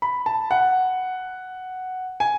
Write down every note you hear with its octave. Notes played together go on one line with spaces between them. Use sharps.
B5
A5
F#5
G#5